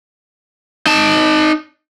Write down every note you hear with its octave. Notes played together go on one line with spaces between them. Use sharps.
D#4 A5